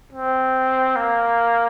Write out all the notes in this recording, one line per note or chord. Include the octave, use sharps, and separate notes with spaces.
C4
A#3